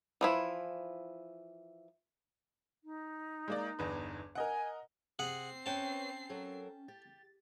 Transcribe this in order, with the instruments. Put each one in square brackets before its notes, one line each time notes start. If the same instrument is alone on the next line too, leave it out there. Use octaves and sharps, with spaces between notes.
[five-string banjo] E3 F3 E4
[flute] D#4
[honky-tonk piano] G#3 A#3 D5
G1 E2 B4
[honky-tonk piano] A#4 D#5 F#5 [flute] G#5
[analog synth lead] C3 [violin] C4 C7 [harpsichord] G#4 F#5
[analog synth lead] C#4 [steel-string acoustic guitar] B4 C#5 [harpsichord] G5 A5
[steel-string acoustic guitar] F#3 A4 A#4
[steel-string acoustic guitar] G4 [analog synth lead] A6